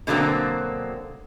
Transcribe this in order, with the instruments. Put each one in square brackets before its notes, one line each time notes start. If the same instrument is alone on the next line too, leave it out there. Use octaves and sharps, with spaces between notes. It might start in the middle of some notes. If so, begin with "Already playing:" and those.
[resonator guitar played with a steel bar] B2 D3 F#3 A#3 C4